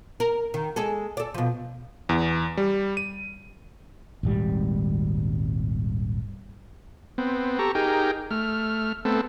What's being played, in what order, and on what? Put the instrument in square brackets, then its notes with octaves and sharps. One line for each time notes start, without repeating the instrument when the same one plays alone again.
[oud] A#4
D#3
G#3 G#4 A4
A4 D5
B2 F3
[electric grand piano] E2
G3
D#7
[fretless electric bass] D#1 G#1 G3
[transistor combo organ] B3 C4
G4 A4 A#5 C#6
D#4 G4 G#4 A#4 G5
A3 F6
A3 B3 C4 A4